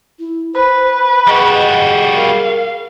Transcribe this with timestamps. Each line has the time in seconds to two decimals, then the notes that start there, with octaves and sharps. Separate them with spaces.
0.19 E4
0.55 B4 C5 B5
1.27 G3 F#4 G#4 D#5
2.16 A#4 F5